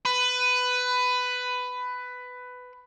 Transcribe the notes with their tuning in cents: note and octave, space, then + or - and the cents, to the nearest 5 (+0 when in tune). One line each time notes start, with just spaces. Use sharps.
B4 +15